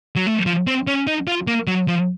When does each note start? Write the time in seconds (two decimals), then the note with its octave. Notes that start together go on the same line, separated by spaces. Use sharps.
0.16 F#3
0.27 A3
0.46 F3
0.67 C4
0.87 C#4
1.07 D#4
1.28 F4
1.47 A#3
1.67 F#3
1.88 F3